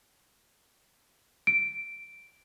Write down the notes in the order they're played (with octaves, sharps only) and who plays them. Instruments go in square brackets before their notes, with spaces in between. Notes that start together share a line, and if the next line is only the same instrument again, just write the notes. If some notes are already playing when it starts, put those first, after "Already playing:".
[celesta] D7